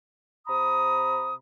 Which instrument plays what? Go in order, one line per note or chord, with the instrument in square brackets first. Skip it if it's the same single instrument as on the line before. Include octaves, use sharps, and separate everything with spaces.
[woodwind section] C3 A#5 B5 D#6